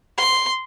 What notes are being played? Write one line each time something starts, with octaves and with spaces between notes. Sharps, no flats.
C6